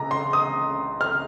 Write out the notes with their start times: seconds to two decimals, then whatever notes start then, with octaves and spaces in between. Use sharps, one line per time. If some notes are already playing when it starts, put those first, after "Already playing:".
Already playing: C#2 A#5
0.11 C6
0.33 D#6
1.01 F6